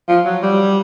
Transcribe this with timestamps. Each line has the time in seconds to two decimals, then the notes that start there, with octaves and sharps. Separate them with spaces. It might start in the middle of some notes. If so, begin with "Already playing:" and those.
0.09 F3
0.26 F#3
0.43 G3